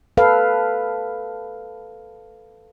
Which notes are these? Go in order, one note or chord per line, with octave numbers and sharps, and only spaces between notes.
A4 B4 F5